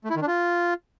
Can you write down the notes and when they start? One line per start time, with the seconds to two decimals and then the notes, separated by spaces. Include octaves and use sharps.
0.04 A3
0.10 E4
0.16 D#3
0.22 D4
0.28 F4